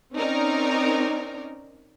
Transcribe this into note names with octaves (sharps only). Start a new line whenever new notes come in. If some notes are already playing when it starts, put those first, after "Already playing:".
C4 C#4 D#4 A#4 D5